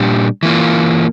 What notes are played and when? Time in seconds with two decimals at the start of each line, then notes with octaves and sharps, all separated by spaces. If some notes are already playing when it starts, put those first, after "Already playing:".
Already playing: A#2 G3 D4 G4
0.43 E3 A#3 F4